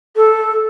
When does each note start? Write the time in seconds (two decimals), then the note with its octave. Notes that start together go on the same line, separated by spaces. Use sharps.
0.16 A4